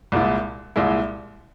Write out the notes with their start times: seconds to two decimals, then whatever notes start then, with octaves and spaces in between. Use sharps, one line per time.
0.12 C2 A#2 G#3 E4
0.76 C2 A#2 G#3 E4